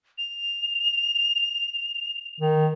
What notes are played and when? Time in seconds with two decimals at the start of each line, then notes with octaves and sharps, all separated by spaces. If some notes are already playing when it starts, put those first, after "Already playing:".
0.18 F7
2.40 D#3